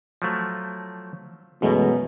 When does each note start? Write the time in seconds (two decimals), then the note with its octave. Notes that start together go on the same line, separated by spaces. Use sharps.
0.22 F3 F#3 A3
1.62 F#2 B2 E3 G#3 A3